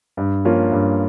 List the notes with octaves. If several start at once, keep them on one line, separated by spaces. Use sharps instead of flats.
G2
F3 A#3 C#4 F4
G2